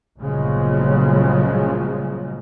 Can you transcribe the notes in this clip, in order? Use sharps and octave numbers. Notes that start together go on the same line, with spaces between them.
G1 A#2 C#3 F3 F#3 G#3